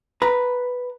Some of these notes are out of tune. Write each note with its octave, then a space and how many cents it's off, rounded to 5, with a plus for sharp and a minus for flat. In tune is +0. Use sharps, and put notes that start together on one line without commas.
B4 +0 A#5 +0